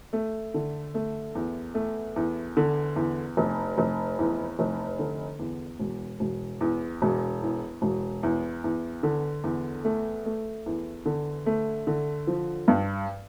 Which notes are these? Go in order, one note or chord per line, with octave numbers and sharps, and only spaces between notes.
A3
D3
A3
E2
A3
E2
D3
E2
F1
F1
E2
F1
D3
E2
E1
E1
E2
E1
E2
E1
E2
E2
D3
E2
A3
A3
E2
D3
A3
D3
F3
G2